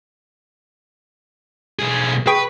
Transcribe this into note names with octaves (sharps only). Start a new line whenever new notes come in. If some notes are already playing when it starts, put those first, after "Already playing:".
B1 G#4
G#4 B4 G5 C#6